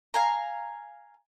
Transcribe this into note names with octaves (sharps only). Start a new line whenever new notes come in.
F5 G#5 A#5